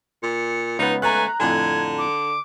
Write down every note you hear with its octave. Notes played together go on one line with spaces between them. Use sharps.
A#2 C#7
C#2 B3 D#4
A3 G#5 A#5 F#6
F2 A2 D3 G#5 G#6
D6